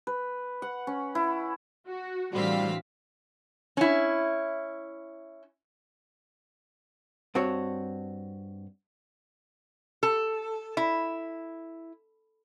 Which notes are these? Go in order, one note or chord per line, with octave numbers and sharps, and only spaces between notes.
B4
F#5
C#4
E4
F#4
A2 D3 E3 G3 C4 F#4 F5 B6
C#4 E4
G2 C4 F#4 C#5
A4
E4